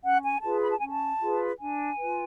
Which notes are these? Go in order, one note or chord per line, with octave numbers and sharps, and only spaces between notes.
C#4 F#5
G#5
F4 G#4 B4 A5
B5
A5
C#4 G#5
A5
F4 G#4 B4
D4 G#5
F4 B4